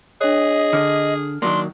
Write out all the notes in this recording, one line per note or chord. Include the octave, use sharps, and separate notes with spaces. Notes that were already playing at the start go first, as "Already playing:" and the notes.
D4 G#4 C#5 D#5
D3 F6
D#3 F#3 A#3 D4 C6